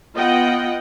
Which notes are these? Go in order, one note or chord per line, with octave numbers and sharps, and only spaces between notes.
B3 F4 D#5 F#5 G5